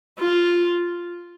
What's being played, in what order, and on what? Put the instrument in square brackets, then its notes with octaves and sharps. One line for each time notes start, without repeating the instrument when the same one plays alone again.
[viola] F4